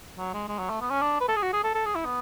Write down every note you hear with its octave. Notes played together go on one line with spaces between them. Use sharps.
F#3
G#3
G#3
F#3
A3
B3
C#4
D4
B4
A4
G#4
F#4
G#4
A4
A4
G#4
E4
B3